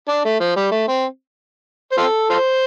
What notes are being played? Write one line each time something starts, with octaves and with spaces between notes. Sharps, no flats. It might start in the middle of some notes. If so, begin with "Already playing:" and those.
D4
A3
F3
G3
A3
C4
C5
C4 F4 A4
F4 A4 C5